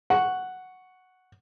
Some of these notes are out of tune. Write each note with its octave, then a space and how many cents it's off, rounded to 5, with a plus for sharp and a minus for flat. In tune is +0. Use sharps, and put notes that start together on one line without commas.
F#5 +0 C#6 +0